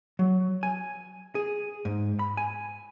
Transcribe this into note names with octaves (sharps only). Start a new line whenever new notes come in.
F#3
G#5
G#4
G#2
B5
G#5